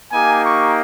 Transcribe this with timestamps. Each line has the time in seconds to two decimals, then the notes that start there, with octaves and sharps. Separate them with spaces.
0.11 A#3 D#4 G4 G#5
0.45 C#6